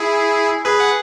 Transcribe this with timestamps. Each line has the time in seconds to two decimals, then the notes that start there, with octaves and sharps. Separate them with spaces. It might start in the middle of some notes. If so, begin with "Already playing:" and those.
Already playing: E4 G#4
0.65 G#4 B4
0.80 F#5